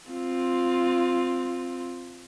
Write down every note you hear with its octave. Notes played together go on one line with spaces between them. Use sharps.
C4 F4